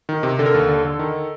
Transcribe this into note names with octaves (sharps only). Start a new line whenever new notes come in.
D#3
C3
D3 A4
A#4
D#2 A4
D3
D3
D#3